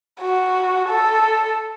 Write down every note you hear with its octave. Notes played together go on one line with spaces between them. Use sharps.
F#4
A4